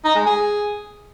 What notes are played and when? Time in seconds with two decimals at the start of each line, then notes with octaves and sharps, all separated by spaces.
0.05 D#4
0.15 G#3
0.26 G#4